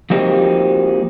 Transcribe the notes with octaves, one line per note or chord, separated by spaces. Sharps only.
F3 A#3 C4 D#4 F#4 G4